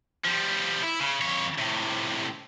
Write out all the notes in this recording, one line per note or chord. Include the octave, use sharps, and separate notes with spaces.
F3 G3
E4
C#3
F2 C#5
A2 C3